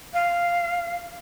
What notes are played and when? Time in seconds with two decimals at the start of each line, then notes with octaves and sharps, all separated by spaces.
0.13 F5